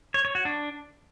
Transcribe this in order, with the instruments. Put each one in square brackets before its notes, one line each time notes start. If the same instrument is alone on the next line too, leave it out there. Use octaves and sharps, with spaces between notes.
[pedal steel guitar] C#5
C#5
F#4
D4